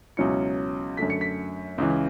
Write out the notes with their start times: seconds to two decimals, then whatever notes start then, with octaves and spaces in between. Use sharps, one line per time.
0.17 C#2 B2 F#3 C#4 E4 C#7
0.97 F#2 D3 A3 B6
1.10 C#7
1.21 B6
1.78 C#2 C#3 E3